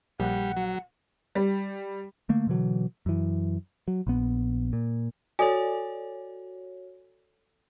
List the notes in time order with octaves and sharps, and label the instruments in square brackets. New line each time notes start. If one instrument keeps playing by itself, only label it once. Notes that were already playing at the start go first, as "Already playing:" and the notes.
[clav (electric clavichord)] A#1 [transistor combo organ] G3 [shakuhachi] F#5
[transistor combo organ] F#3
[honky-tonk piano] G3
[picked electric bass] D3 A3 A#3
B2 D3 E3 F#3
F#2 E3
F#3
A#1 B3
A#2
[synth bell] F#4 C#5 [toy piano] A4 D5 G#5